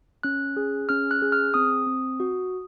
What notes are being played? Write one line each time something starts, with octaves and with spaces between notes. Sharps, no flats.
C#4 F#6
G#4
C#4 F6
F#6
G#4
F6
C4 D#6
C4
F#4